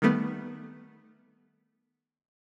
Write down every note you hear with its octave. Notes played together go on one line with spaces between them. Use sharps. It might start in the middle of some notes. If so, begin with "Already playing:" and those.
D#3 G3 A3 B3